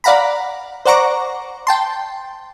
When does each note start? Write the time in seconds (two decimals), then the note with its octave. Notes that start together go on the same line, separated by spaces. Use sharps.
0.04 D5 F5 F#5 A#5 B5
0.86 C5 D5 F#5 A#5 C#6 D6
1.67 G5 A5 C6